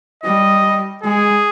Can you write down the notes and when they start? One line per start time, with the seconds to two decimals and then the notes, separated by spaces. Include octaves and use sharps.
0.23 G3 D#5
1.04 G#3 G#4